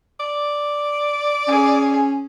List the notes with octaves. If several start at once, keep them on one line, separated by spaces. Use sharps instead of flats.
D5
C#4 G#4